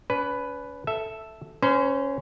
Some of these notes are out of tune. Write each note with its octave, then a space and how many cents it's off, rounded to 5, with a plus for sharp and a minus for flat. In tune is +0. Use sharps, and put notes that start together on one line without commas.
C#4 +40 B4 +5
A4 +0 E5 +0
C#4 +0 C5 -35 A#5 +30